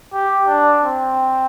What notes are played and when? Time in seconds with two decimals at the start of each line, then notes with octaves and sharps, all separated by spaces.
0.13 G4
0.47 D4
0.83 C4